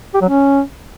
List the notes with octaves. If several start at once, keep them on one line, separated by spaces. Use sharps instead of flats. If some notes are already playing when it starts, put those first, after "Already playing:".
G4
F#3
C#4